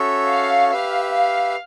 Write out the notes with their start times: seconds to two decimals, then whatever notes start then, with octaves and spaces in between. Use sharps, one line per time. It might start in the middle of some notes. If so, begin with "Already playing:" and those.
Already playing: C#4 F#4 A4 C#5 E5
0.29 F5
0.71 G4 B4 E5 F5
1.14 F5